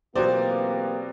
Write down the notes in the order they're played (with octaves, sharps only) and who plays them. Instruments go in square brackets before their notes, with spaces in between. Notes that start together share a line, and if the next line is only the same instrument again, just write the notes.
[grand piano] B2 F#3 D5 [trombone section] E3 F4 G4 [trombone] A#3 [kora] C4